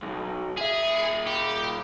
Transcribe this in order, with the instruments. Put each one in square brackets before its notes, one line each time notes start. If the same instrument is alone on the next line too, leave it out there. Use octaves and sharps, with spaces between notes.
[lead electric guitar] B1 E2
[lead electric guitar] A#2 E5 [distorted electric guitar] G#4
[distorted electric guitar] G4